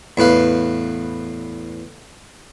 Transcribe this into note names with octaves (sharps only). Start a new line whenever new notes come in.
E2 A2 B4 F5